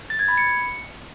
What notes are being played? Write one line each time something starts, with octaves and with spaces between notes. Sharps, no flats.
A6
G#6
B5
C#7